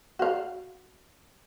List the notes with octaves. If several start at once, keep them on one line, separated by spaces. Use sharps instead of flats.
F#4 F5